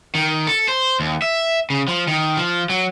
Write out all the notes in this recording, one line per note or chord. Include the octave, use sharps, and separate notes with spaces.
D#3
A4
C5
D#2
E5
C#3
F3
D#3
F3
F#3